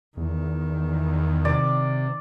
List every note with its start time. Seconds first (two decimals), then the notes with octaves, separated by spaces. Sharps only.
0.17 E2 D#3
1.45 C3 D5